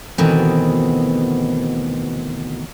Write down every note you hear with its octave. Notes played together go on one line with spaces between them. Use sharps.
D2 B2 D#3 E3 C4